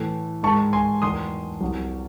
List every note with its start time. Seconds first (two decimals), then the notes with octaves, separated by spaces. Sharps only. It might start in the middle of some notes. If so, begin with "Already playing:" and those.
Already playing: A2 E3 A3
0.43 G#2 D#3 G#3 A5 C#6
0.73 G#5 C6
1.02 E2 D#3 F#3 A3 C6 D#6
1.61 C2 C3 F#3